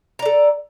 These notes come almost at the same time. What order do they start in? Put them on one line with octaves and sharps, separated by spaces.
A#5 D5 A4